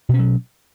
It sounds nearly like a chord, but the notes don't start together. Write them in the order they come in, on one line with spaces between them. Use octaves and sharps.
B2 C#4 F#3